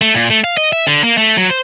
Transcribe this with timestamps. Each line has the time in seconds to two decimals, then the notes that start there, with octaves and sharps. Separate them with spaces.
0.01 A3
0.14 A#2
0.30 A3
0.44 F5
0.57 D#5
0.73 E5
0.87 D3
1.04 A#3
1.18 A3
1.37 F#3
1.50 C5